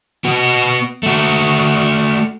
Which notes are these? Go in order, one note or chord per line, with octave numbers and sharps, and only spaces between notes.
B3 F#4
A3 F#4